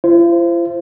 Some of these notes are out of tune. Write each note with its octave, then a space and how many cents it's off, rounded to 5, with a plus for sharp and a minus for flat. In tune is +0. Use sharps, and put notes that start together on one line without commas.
F4 -45 C5 +0